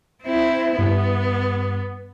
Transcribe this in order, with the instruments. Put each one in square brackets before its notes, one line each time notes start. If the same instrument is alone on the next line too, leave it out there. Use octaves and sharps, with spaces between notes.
[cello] C4 E4
[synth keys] G2 [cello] B3